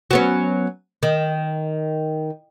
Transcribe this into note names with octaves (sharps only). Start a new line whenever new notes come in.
F#3 B3 C#4
D#3